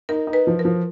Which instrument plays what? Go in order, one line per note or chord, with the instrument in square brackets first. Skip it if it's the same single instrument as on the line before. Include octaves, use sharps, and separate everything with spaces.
[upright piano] D#4 [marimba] A#4
[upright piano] D#4
[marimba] B4
[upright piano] F3
[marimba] A#4
[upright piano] F3